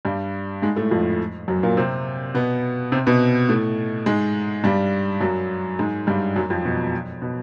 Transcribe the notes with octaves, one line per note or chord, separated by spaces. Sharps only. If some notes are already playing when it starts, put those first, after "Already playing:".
G2 G3
G#2 G#3
A2 A3
F2 F3
F#2 F#3
A#2 A#3
C3 C4
B2 B3
C3 C4
B2 B3
A2 A3
G#2 G#3
G2 G3
F#2 F#3
G#2 G#3
G2 G3
F#2 F#3
F2 F3
B2
B2